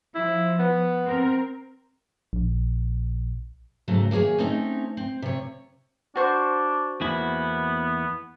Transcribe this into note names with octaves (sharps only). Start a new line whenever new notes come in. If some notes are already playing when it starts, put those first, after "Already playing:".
F3 E4
B3
C4 A#4
A#1
G#2 C#3 F#3 A3 A4
D#3 A#3 G#4 C#5 G#5
A3 C4 C#4 D#4 D#5
C4
C3 C#5
D4 F#4 C5 C#6
E2 A#3 B3 E4